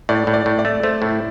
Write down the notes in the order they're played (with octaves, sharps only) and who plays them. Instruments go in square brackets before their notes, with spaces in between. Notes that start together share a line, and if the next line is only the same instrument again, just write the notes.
[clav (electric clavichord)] A2 [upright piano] D5
[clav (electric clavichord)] A2
[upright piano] D5
[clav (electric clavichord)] A2
[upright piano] D5
[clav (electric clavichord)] A3
[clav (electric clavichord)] A3 [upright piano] C5
[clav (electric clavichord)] A2 [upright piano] E4